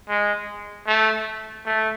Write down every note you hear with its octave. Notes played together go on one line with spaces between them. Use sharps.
G#3
A3
A3